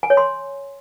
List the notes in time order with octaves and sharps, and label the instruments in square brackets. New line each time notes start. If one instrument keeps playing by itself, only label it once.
[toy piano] G#5
C#5
C6